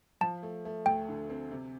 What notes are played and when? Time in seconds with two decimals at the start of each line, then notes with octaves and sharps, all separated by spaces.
0.21 F3 A5
0.43 A3
0.65 A3
0.86 D2 G5
1.08 D3
1.30 C4
1.51 C3